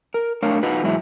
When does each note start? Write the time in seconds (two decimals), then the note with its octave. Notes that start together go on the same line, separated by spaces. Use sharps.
0.14 A#4
0.42 A3 D4 A#4 C#5 F5
0.63 D#4 F4 F#4 B4
0.83 E2 G#2 F#3 E4